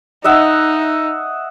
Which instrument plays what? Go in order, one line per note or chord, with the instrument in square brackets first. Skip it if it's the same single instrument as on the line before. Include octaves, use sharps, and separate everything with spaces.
[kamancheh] D#4 [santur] D#5 E5 F#5